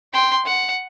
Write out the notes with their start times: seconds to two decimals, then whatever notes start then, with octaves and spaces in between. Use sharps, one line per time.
0.13 G5 C6
0.45 F#5